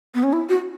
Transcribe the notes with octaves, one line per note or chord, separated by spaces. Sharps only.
B3
C#4
E4
F#4